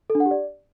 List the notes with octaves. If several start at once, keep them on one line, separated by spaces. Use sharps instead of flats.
A4
D4
F#5
G4
D5